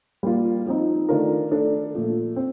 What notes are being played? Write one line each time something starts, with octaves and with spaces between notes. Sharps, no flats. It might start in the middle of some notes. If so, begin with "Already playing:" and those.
G3 A#3 F4
F3 C4 D#4
D#3 A3 D4 F4 A#4
A3 D4 A4
A#2 F3 A3
C4